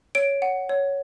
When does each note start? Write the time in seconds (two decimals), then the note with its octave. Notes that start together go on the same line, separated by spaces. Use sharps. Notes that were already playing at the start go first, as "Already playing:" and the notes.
0.15 C#5 D7
0.42 F#5
0.69 C#5